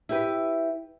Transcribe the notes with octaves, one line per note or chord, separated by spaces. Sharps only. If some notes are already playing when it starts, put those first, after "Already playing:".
E4 G4 B4